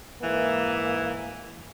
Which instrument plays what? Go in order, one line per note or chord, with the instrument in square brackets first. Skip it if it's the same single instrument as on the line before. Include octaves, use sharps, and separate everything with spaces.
[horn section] G#2 E3 [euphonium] A#3